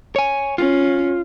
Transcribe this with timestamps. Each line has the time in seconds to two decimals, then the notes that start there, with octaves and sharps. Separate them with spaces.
0.16 C#5 G#5
0.58 C#4 F4